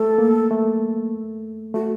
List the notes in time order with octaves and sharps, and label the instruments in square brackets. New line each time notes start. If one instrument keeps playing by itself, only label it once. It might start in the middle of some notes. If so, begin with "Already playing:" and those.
Already playing: [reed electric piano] A3 [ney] A4
[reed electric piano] A#3
A3
[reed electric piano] A3 [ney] F#4